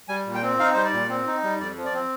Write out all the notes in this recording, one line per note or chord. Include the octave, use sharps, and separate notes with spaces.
G3 G#5
A#2
G5
C4
D#4 F5
G3 C5
D5
A#2
C4
D#4
G3
F2 D5
F3
D5
C4